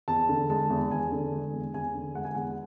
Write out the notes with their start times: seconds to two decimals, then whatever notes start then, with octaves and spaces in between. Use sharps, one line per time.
0.08 E2 A5
0.29 D3
0.50 G#3 A5
0.70 E2
0.91 E2 G#5
1.12 D3
1.32 G#3
1.54 E2
1.74 E2 G#5
1.95 D3
2.15 G#3 F#5
2.25 G#5
2.35 E2 F#5